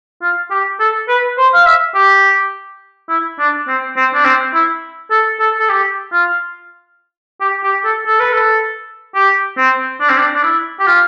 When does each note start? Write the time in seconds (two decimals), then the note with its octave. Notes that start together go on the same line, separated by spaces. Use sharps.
0.22 F4
0.51 G4
0.80 A4
1.08 B4
1.38 C5
1.53 F5
1.66 E5
1.95 G4
3.09 E4
3.39 D4
3.68 C4
3.97 C4
4.14 D4
4.25 C4
4.54 E4
5.11 A4
5.40 A4
5.59 A4
5.69 G4
6.12 F4
7.41 G4
7.63 G4
7.85 A4
8.07 A4
8.20 B4
8.33 A4
9.15 G4
9.57 C4
10.01 D4
10.09 C4
10.18 D4
10.34 D4
10.43 E4
10.80 G4
10.87 F4